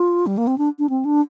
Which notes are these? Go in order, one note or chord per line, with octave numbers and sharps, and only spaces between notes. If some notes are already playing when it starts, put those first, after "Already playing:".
Already playing: F4
G3
A#3
C4
D4
D4
C4
D4